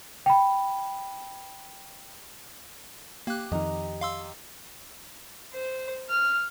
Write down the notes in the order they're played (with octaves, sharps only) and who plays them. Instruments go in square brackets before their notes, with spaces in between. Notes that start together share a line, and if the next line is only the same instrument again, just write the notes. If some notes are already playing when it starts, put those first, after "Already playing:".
[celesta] G5 B5
[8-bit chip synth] A#3 F#6 [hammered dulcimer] G4
[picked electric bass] F2 D#3 [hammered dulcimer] D#5 A#5
[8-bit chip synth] F5 C6 E6
[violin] C5
F6